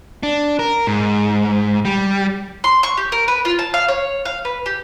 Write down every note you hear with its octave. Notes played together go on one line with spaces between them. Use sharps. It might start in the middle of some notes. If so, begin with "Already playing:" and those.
D4
A#4
G#2
G3
C6
C#6
G4
A#4
B4
F4
A5
F5
C#5
F5
B4
G4